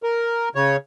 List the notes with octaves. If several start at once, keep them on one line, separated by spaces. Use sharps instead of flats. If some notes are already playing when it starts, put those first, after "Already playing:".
A#4
C#3 C#5